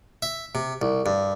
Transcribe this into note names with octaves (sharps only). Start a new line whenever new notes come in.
E5
C3
C2
G2